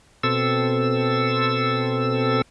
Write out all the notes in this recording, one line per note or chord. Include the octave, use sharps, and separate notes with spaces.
B2 C4 A4 E6